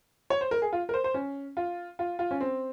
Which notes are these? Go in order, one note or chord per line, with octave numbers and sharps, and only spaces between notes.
C#5
C5
A#4
G#4
F4
A#4
C5
C5
C#4
F4
F4
F4
C#4
C4